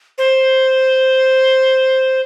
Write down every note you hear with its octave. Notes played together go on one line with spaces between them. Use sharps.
C5